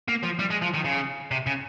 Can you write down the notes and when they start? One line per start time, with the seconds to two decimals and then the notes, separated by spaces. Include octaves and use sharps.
0.08 A#3
0.23 F3
0.39 G3
0.50 G#3
0.62 F3
0.74 D#3
0.85 C#3
1.31 C3
1.46 C#3